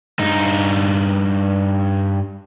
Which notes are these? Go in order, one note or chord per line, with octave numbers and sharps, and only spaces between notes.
G2 D#4